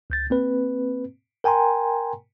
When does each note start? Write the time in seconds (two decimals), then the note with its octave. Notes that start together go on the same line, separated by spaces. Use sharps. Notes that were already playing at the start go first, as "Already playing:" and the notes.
0.10 C#2 G6 A6
0.30 A#3 C4 B4
1.44 A#4 G5 G#5 A#5 C6